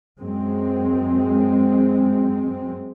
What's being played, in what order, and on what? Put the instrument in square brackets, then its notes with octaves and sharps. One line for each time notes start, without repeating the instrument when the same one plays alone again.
[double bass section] F#2 G#3 C4